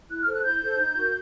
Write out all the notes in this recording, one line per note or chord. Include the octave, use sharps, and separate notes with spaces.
E4 F#6
F6
A4 C5
F#6
E4 G6
A4 C5
D#4
F#4 A#4